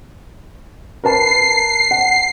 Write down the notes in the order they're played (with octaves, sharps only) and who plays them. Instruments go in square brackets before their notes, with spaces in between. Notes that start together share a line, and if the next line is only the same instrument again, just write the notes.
[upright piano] A#4 B4 A5 [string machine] C7
[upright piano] F#5